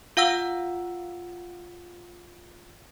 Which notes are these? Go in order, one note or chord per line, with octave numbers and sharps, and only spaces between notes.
F4 F5 F#5 E6